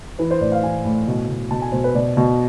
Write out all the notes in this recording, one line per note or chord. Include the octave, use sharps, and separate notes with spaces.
E3 B4
C5
A2 D5
F5
E3 G#5
A2
B2
B2
B2 A5
G#5
B2 C5
B4
B2 D5
B2